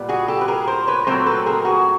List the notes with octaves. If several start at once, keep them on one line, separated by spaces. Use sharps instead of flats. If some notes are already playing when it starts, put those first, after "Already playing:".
Already playing: A#2 G3 B3
F#4 G#4
G4 A4
B4
G#4 A#4
A#4 C5
B4 C#5
A#2 F#3 A3 C4 A#4 C5
A4 B4
G#4 A#4
F#4 G#4